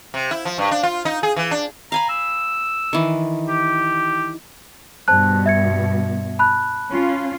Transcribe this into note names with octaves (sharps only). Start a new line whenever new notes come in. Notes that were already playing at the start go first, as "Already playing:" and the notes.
C3
E4
F3
G2
D4
F4
D#4
G#4
E3
D4
F5 G#5 A#5 B5
E6
D#3 E3
G4
G2 B2 C5 A5 F#6
E5 G#6 C#7
A5 B5 F#6
C#4 F4